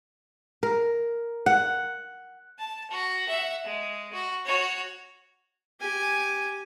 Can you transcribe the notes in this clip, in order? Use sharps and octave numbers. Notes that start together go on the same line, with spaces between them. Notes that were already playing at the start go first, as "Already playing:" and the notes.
A#4
F#5
A5
F#4
E5 F#5
G#3
F#4
F#4 C#5
G4 G#5